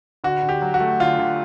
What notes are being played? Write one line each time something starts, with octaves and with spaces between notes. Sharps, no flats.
D3 F#4
D3
G4
F#3
F#4
A3
D3 F4
D3